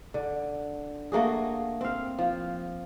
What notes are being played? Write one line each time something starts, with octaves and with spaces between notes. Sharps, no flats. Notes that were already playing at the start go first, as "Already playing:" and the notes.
D3
A3 A#3 F#4 G#4
C4 F5
F3